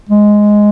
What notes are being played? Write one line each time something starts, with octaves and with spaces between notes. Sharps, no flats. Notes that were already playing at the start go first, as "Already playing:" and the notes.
G#3